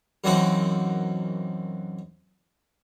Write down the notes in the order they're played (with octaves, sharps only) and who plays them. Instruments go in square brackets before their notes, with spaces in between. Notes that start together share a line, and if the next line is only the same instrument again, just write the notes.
[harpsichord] F#2 E3 A#3 C4 D#4 F#4